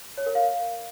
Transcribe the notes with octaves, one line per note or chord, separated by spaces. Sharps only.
C#5
A#4
F5